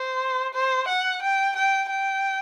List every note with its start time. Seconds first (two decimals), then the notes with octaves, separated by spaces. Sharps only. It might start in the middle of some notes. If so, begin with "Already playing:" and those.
Already playing: C5
0.54 C5
0.88 F#5
1.22 G5
1.57 G5
1.90 G5